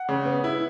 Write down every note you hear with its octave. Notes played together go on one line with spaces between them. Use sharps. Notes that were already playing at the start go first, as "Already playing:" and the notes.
Already playing: F#5
C#3
B3
E4